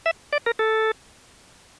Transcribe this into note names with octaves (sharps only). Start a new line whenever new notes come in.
E5
D5
A#4
A4